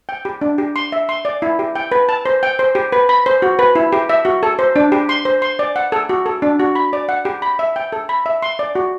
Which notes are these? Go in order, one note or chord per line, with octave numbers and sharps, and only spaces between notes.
G5
G4
D4
G4
C6
E5
C6
D5
E4
G4
G5
B4
A5
C5
G5
C5
G4
B4
B5
C5
F#4
B4
E4
G4
E5
F#4
A4
C5
D4
G4
C6
C5
C6
D5
F#5
A4
F#4
A4
D4
F#4
B5
D5
F#5
G4
B5
E5
G5
A4
B5
E5
C6
D5
F#4